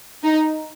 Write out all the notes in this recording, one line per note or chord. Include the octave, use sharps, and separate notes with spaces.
D#4